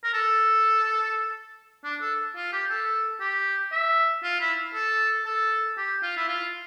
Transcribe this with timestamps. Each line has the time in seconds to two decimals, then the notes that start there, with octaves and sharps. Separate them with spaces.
0.04 A#4
0.14 A4
1.84 D4
2.02 A4
2.36 F4
2.53 G4
2.70 A4
3.20 G4
3.72 E5
4.24 F4
4.40 E4
4.74 A4
5.25 A4
5.77 G4
6.03 F4
6.17 E4
6.28 F4